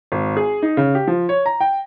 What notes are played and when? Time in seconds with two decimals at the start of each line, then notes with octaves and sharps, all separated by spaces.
0.12 G#1
0.37 G#4
0.62 D#4
0.77 C#3
0.95 G4
1.07 F3
1.29 C#5
1.46 A#5
1.60 G5